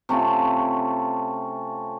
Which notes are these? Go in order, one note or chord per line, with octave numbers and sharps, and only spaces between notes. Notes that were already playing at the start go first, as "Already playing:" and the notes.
C3 A3 C#4 F4